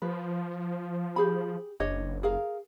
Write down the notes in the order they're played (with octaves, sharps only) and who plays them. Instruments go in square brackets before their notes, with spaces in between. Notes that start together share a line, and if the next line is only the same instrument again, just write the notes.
[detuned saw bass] F3 [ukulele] B4
[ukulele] G4 G#4 B5
[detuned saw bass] F#1 [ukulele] D4 C#5 D#5
[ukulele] G#4 A#4 F5